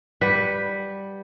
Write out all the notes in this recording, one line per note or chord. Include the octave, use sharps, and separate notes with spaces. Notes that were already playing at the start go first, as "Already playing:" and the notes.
G3 B4 F#5